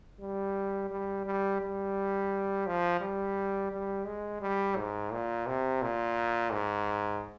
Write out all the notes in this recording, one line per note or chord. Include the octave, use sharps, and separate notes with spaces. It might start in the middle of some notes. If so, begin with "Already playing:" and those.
G3
G3
G3
G3
F3
G3
G3
G#3
G3
G#2
A#2
C3
A#2
G#2